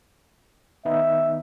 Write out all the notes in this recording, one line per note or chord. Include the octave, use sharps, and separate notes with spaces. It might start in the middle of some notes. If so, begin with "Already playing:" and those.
D#3 B3 D#4 E5